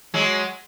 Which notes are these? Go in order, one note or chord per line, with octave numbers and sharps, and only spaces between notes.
F#3 G#3